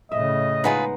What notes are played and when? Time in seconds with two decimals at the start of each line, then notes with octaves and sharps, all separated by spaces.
0.12 A2 C#3 D#5 E5
0.64 G#3 B3 D#4 F4 G#4 B4